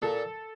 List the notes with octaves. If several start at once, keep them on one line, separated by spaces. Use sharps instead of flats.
A#2 A4